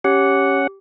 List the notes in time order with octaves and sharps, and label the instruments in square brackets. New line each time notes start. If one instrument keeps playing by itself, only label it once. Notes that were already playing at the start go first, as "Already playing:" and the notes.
[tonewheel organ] C#4 F#5 [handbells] G4